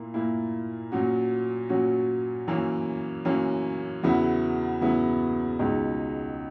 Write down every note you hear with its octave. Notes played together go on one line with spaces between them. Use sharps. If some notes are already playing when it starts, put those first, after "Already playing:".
Already playing: A#2 A#3 E4
A#2 A#3 E4
A#2 F#3 C#4 F#4
A#2 F#3 C#4 F#4
F#2 E3 A#3 C#4
F#2 E3 A#3 C#4
E2 C#3 F#3 B3 E4
E2 C#3 F#3 B3 E4
C#2 B2 G#3 D#4